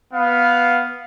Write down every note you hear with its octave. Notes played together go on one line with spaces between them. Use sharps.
B3 F5